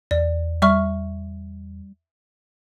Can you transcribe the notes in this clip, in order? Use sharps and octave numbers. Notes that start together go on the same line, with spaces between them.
E2 D5
G3 E5 C#6 F6